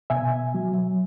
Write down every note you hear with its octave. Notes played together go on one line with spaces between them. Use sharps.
B2 E5 G#5
F#3